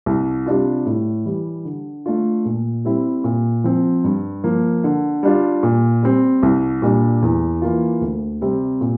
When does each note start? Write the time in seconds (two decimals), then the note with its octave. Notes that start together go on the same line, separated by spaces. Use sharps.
0.06 C2
0.46 C3 G3 D4 F4
0.86 A2
1.26 E3 G3
1.65 D3
2.06 A3 D4 F4
2.45 A#2
2.85 G3 C4 E4
3.24 A#2
3.64 F3 C4
4.04 G2
4.44 F3 A#3
4.84 D3
5.23 G3 D4 F4
5.63 A#2
6.03 G3 C4
6.43 C2
6.82 A#2 G3 D4
7.22 E2
7.62 E3 A#3 F4
8.01 D2
8.41 C3 G3 C4
8.81 A#2